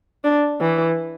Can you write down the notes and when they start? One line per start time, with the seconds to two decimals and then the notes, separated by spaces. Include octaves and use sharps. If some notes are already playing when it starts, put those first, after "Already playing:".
0.24 D4
0.61 E3